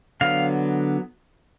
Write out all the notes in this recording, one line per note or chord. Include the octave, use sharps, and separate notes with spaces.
D3 F#3 B3 F5